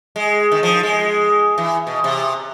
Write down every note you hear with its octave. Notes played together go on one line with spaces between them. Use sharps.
G#3
D#3
F3
G#3
E3
B2
C3